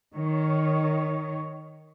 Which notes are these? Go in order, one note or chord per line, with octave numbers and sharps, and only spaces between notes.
D#3 C#5